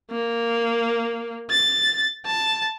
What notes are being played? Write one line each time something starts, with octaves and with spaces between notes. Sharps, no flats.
A#3
A6
A5